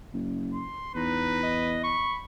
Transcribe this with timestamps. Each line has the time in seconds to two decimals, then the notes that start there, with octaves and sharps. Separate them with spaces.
0.13 F#1
0.54 C6
0.95 E2 D#4 B4
1.43 D#5
1.84 B5 C#6